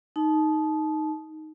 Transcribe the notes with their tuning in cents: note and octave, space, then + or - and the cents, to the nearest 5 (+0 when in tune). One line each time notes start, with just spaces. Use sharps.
D#4 +0 A5 -25